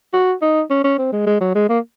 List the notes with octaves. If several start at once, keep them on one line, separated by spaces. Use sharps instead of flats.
F#4
D#4
C#4
C#4
C4
G#3
G#3
F#3
G#3
A#3